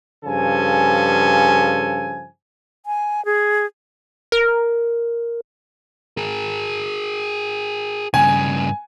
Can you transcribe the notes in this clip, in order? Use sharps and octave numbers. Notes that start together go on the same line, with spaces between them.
G2 C#3 F3 A4 G#5
G#5
G#4
A#4
G#4 A#4
G2 C#3 G#5